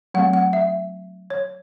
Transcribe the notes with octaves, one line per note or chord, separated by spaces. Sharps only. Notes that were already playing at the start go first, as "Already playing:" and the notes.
F#3 A3 C4 F#5
F#5
E5
C#5